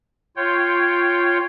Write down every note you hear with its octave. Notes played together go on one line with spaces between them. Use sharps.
F4 C#5 G5